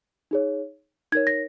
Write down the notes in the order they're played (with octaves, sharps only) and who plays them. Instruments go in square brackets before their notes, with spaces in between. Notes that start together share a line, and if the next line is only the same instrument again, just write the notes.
[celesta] D#4 G#4 C#5
D#4 A#4 C#5 G#6
A#6